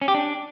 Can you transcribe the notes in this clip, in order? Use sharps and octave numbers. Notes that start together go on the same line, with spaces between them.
C#4
G4
D4